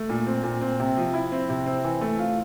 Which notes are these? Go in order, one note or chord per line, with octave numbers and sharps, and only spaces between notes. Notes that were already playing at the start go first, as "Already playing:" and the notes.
Already playing: A3
A#2
C4
A#2
C4
C3
F3
E4
C4
C3
C4
E3
A3
F4